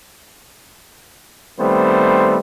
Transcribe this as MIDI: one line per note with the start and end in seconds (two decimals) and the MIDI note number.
1.59 2.38 51
1.59 2.38 55
1.59 2.38 57
1.59 2.38 59
1.59 2.38 60
1.59 2.38 72